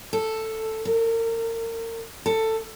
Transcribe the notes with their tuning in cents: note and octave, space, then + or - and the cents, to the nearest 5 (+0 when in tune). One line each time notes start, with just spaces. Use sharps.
A4 +5
A#4 -35
A4 +15